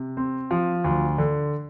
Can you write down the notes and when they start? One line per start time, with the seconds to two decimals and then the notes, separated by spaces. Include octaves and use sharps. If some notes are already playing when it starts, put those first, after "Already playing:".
Already playing: C3
0.17 C4
0.51 F3
0.84 D2
1.18 D3